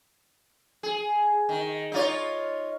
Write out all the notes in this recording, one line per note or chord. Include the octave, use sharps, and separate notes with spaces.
G#4
D#3
D#4 F4 C#5